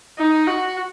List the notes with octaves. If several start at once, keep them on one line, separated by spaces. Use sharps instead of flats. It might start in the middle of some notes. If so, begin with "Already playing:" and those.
D#4
F#4